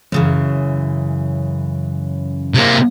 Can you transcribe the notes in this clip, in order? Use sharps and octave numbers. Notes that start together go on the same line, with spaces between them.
F#2 C#3 E3
C3 A#3